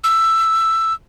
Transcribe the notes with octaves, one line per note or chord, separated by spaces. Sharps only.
E6